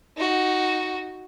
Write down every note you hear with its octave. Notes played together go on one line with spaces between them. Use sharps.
D#4 F#4